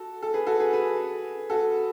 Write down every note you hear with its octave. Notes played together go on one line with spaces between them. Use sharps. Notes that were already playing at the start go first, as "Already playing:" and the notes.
Already playing: F#4 A4
A4
G#4 B4
F#4 A4
G#4 B4
G#4 B4
F#4 A4